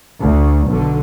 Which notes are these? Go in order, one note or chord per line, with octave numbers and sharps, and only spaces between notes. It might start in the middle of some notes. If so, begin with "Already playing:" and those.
D2
B1 D3